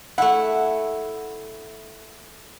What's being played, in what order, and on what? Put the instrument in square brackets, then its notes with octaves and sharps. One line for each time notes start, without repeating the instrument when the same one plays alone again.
[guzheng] A3 E4 [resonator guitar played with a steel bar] F#5